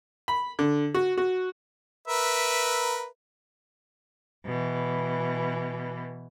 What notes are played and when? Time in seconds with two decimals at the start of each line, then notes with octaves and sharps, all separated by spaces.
0.28 B5
0.59 D3
0.95 F#4
1.18 F#4
2.08 A#4 B4 E5
4.46 B2 E3